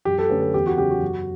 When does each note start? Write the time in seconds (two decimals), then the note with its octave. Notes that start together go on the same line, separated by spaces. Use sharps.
0.05 F#2 G4
0.19 A4
0.30 D3 A3 C#4 B4
0.42 A4
0.54 E2 G4
0.66 F#4
0.77 C#3 F#3 B3 G4
0.90 F#4
1.02 F#2